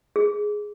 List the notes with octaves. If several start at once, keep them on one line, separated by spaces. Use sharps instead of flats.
G#4